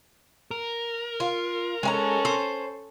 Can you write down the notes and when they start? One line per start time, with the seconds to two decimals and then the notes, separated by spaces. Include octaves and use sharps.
0.51 A#4
1.20 F4
1.83 G#3 C#4 A4 G#5 A#5
2.25 C5